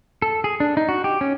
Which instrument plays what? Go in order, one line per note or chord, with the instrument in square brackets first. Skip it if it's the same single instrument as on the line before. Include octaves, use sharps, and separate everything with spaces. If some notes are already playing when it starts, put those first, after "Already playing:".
[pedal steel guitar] A4
G#4
D4
D#4
F#4
G4
C#4